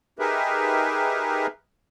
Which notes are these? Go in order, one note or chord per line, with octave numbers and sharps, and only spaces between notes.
D#4 G4 G#4 A#4 B4 E5